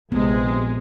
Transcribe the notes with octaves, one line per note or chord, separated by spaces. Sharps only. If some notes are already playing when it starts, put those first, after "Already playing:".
A#1 C3 G#3 B3